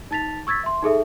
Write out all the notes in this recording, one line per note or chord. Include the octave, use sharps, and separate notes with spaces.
D#4 A5 A6 B6 F7
C#6 E6 G#6 A6 B6
E5 C6
D#4 G#4 A4 E5